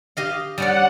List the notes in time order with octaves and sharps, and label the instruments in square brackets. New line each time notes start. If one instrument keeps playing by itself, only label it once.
[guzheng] G4 D#5 F5
[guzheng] G3 C#4 D5 [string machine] F#5